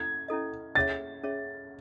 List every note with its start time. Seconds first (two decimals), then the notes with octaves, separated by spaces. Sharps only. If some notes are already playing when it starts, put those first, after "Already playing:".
Already playing: C#4 E4 A4 G#6
0.28 C#4 E4 A4 D#5
0.75 C#4 G#4 C#5 E5 A6
1.23 C#4 G#4 C#5 E5